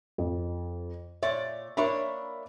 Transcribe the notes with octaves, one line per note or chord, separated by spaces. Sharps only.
F2
A#2 C#5 D5 E5
A#3 D4 A#4 C#5 E5 B5